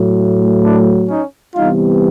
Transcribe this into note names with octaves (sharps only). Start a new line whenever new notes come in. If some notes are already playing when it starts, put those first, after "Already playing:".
Already playing: A2 F#3 A3
D4 E4
C#4 D#4
C3 E3 G3 B3 D#4 F4